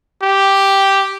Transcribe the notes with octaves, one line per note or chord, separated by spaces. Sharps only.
G4